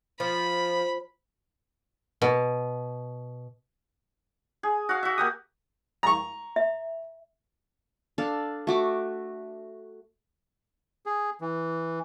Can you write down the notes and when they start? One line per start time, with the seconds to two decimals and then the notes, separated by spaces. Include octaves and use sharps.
0.20 F3 B5
2.22 B2
4.63 G#4
4.89 F#4 F5
5.03 F#4 E5
5.18 A#3 G4 D#6
6.03 A#5 C#6
6.56 E5
8.18 D4 A4 F5
8.67 A3 F#4 D6
11.06 G#4
11.41 E3